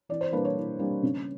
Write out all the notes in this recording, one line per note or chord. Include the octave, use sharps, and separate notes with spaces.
E3 D5
C5
G3 A#3 D4 B4
C#5
E3
G3 A#3 D4
C#3